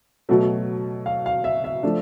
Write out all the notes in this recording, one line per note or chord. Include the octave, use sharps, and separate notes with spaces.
B2 F#3 A3
F5
F5
E5
E5
F3 A3 D4